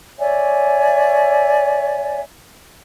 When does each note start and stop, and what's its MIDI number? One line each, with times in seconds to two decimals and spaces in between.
0.19 2.22 73
0.19 2.22 74
0.19 2.22 76
0.19 2.22 80